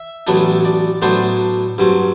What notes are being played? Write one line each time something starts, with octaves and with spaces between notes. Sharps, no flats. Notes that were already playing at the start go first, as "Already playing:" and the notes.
Already playing: E5
A1 A2 F#3 B3 D4
D5
A2 F#3 B3 D4 C5
G2 F#3 C4